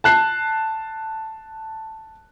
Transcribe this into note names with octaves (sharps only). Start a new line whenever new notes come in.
A5 F#6 C7